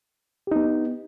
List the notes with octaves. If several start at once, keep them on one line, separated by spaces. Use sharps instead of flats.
B3 D#4 G4